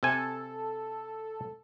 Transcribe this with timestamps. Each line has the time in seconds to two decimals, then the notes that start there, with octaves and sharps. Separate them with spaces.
0.03 C3 A4 G#5